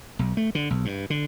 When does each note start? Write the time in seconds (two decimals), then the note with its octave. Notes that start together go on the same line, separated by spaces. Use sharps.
0.19 B1
0.37 A3
0.55 D3
0.70 B1
0.85 G2
1.10 D3